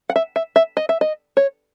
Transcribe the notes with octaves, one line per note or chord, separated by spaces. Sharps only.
F#5
E5
E5
E5
D#5
E5
D#5
C#5